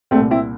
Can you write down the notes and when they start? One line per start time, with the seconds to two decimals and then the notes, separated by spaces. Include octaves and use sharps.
0.11 C2 A3 C4
0.16 A#2
0.31 C4 E4